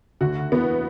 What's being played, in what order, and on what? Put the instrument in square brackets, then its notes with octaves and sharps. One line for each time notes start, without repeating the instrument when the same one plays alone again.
[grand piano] D2 D3 [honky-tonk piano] F#4
[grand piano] E2 E3 [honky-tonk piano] B3